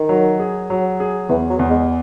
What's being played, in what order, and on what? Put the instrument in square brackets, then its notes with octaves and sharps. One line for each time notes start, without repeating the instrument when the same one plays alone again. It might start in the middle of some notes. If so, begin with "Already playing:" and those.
Already playing: [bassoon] D#3
[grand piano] F#3
G#4
F#3
G#4
[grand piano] E2 [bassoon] E3
[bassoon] F#3
[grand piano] E2
[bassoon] G#3